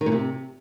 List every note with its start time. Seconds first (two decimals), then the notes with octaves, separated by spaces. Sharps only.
0.01 D#3
0.06 A#2
0.12 C3